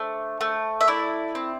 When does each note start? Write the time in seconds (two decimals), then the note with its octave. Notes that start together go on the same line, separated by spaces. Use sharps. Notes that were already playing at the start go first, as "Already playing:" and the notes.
Already playing: A3 D4 C5
0.41 A3
0.81 E5
0.88 E4 D5
1.35 C4